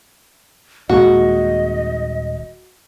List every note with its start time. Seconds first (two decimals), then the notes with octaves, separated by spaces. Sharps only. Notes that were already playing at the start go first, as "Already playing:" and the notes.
0.89 D#1 A#2 G#3 F#4 D#5